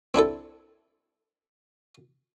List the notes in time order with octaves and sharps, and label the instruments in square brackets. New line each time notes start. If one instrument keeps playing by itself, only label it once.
[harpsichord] C4 D4 E4 A4